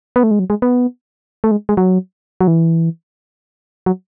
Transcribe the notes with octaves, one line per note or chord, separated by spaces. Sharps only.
B3
A3
G#3
F#3
G#3
B3
A3
G#3
G#3
F#3
F#3
E3
F#3